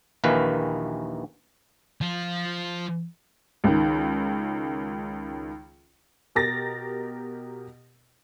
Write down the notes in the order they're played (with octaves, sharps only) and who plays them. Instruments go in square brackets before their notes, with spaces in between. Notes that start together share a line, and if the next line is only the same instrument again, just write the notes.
[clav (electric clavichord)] A#1 D#2 D#3 E3 B4 F5
[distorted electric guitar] F3 F4
[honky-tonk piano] C#2 D#3
B2 G4 A#4 A6 A#6